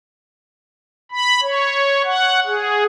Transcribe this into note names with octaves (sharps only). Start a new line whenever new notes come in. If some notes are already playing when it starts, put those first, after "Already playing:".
B5
C#5
F#5
G#4